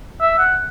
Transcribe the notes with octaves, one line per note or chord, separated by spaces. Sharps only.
E5
F#5